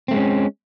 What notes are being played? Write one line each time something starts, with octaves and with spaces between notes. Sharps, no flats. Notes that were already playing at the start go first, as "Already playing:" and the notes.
G#3 A3 C4 C#4